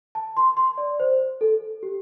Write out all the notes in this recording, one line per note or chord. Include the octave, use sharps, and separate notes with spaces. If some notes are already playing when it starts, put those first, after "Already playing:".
A5
C6
C6
D5
C5
A4
G4